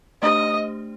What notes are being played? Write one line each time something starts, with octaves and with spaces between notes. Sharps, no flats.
A3 D4 G4 C5 D#5